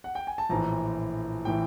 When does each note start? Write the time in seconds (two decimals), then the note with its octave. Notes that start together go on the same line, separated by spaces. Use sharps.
0.04 F#5
0.15 G5
0.27 G#5
0.38 A5
0.49 A#1 A2 E3 A#5
1.45 A2 E3 G5